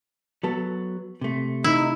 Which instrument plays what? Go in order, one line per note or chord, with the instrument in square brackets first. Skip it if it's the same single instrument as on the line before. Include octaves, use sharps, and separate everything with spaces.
[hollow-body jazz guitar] F#3 B3 A4
C3 A3
[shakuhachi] D#4 [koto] E4